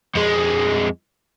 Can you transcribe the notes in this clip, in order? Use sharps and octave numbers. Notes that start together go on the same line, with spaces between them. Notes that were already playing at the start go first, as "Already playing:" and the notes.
F2 G#3